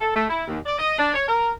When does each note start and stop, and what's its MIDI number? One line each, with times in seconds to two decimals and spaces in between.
0.01 0.11 69
0.15 0.25 57
0.29 0.45 64
0.48 0.59 39
0.66 0.78 74
0.79 0.97 75
0.98 1.13 62
1.14 1.24 73
1.28 1.51 70